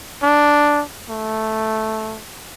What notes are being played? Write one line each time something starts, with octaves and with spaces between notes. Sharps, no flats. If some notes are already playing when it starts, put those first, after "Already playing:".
D4
A3